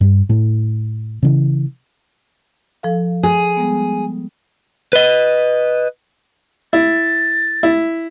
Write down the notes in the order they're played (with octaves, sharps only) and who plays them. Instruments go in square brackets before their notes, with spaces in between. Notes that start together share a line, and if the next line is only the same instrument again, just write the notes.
[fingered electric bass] G2
A2 A3
C#3 E3
[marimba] F3 A4 F5
[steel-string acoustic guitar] G#4
[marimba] G3 G#3 B3
[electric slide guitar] B4 D#5
[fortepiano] E4 [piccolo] A6
[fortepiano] E4